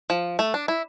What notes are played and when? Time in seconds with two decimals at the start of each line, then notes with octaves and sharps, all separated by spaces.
0.10 F3
0.39 A3
0.54 D4
0.68 E4